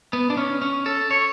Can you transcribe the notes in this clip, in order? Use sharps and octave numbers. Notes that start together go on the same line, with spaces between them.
B3
D4
C#4
C#4
A4
C#5